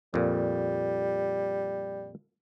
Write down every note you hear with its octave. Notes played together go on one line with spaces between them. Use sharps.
F2 A#2 G3